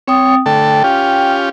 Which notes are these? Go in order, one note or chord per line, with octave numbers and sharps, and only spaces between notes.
C4 C#5 G5 D#6
D3 A3 A4 G5
C#4 F4 G4